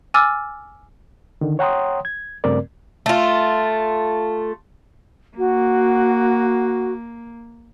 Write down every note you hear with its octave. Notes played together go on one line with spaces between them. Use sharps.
G#5 D6 E6 F6 A6
D3 D#3
C#5 F#5 G5 A#5 C6 D#6
G#6
G2 C#3 A3 C4 A#4 D5
A3 F4
A#3 F#4